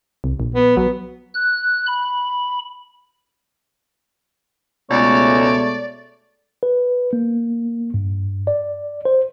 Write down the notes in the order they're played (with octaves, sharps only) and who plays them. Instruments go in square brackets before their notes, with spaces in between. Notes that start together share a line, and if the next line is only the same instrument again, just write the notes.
[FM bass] C2
A#1
[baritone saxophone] B3
[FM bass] F#3 [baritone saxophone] B3
[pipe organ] F#6
B5
[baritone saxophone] C#2 [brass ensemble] B2 G#3 A3 [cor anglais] C#5 [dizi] D5
[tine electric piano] B4
A#3
G2
D5
C5